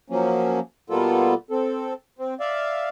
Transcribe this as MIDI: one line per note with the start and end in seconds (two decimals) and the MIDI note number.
0.10 0.59 53
0.10 0.59 54
0.10 0.59 58
0.10 0.59 61
0.90 1.34 47
0.90 1.34 55
0.90 1.34 58
0.90 1.34 59
0.90 1.34 65
0.90 1.34 69
1.51 1.93 60
1.51 1.93 69
2.19 2.34 60
2.40 2.89 74
2.40 2.89 76
2.40 2.89 77